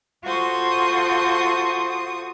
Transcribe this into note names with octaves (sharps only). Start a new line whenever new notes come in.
F4 F#4 A4 C5 C#6 D#6